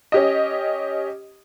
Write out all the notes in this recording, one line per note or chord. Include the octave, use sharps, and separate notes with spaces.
C#4 G4 D#5